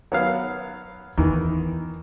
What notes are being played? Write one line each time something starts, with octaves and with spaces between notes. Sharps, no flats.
F#3 B3 F5
E2 D#3 E3